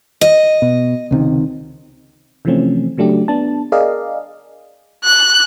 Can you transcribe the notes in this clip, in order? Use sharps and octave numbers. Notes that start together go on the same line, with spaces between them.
D#5
B2
C#2 C3 D#3
C3 E3 F3 A3 C4 C#4
C#3 F#3 A3 D4 G4
B3 D4 A5
G#4 A#4 D5 D#5 F5
F#6